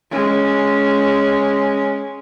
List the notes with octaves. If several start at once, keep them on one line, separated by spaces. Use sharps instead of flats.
G#3 C#4